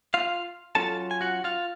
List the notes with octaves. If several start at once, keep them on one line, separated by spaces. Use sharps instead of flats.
F4 F5
F#3 C#4 F4 A4 A5
G#5
F#4 F#5
F4 F5